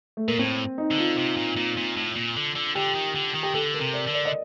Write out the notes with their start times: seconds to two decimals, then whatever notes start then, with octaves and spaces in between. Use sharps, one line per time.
0.17 A3
0.28 A#2 A#3
0.39 A2 C4
0.78 D#4
0.91 D3
0.98 F4
1.17 C3
1.37 A#2
1.57 A#2
1.77 A#2
1.97 A2
2.16 A#2
2.36 D3
2.55 D3
2.75 D3 G4
2.95 D#3
3.15 D3
3.34 D#3
3.43 G4
3.54 D3 A4
3.74 A#4
3.80 C3
3.94 D5
4.07 D3
4.14 D5
4.25 D#5